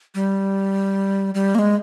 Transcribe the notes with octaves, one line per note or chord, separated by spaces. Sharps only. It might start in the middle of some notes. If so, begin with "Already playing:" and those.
G3
G3
A#3
G#3